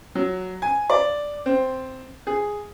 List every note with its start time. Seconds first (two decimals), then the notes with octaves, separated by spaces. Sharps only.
0.15 F#3
0.62 G#5
0.90 D5
1.46 C4
2.27 G#4